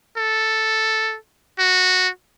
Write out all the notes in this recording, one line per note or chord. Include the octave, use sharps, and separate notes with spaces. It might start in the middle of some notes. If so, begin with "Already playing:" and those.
A4
F#4